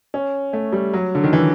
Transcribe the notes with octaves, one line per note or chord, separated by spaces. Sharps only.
C#4
A3
G3
F#3
D3
D#3
E3